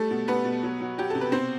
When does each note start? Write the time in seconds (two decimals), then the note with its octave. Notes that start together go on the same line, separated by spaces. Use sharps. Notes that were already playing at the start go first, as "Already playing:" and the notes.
Already playing: G3 A3 A4
0.11 B2
0.28 G3 B3 B4
0.45 B2
0.63 F#3
0.81 F#3
0.98 F#3 G4
1.10 C3 A4
1.21 B4
1.32 B2 C4 C5